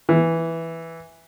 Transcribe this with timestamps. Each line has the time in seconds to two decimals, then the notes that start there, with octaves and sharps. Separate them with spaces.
0.09 E3